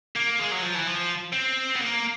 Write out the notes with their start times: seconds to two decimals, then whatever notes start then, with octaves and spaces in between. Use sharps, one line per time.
0.16 A#3
0.39 G#3
0.52 F#3
0.63 F3
0.75 E3
0.87 F3
1.33 C4
1.75 B3
1.80 A#3